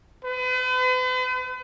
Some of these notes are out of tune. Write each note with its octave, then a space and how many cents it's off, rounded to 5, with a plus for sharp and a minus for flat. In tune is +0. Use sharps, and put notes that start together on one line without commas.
B4 +45